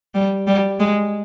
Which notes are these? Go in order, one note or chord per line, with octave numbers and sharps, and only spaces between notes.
G3
G3
G#3